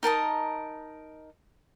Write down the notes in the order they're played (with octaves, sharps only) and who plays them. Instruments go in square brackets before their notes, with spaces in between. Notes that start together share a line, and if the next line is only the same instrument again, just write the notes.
[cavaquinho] D#4 A#4 A5 D#6